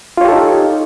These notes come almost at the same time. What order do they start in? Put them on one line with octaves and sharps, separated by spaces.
F4 C#5 G4 A4 D#4